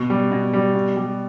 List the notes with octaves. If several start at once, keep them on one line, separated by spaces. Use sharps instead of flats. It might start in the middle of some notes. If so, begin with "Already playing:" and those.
Already playing: B2
G3
B2
G3
B2
G3